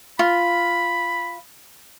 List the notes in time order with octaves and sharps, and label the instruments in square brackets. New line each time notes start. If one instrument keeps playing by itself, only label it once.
[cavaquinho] F4 [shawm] B5